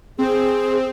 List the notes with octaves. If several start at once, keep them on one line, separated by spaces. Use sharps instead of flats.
C4 G#4